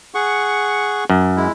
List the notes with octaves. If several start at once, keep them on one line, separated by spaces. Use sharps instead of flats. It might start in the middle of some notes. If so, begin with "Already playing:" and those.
G#4 F#5 C#6
F#2
G#3 E4